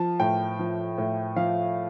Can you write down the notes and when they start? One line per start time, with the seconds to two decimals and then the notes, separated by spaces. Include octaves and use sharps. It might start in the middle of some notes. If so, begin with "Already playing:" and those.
Already playing: F3 A5
0.20 A2 G5
0.59 F3
0.98 A2
1.36 F3 F5